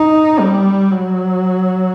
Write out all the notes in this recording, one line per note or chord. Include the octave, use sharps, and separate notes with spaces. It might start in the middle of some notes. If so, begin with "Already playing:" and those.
Already playing: D#4
G3
F#3